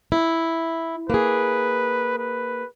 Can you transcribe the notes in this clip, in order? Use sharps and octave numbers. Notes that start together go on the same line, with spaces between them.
E4
A#3 G#4 B4
B4